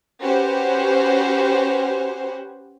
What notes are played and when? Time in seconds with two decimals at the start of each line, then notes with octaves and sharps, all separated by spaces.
0.22 C#4 F#4 G4 B4 C5